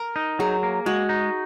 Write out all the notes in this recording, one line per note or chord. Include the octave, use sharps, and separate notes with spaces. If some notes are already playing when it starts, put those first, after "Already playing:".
Already playing: A#4
D#4
F#3 G#4
A#3
G#3 F#4
D#4